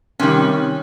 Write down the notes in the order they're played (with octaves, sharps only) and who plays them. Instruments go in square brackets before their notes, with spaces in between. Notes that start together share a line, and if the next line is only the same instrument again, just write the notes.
[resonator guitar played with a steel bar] C3 D#3 G3 C#4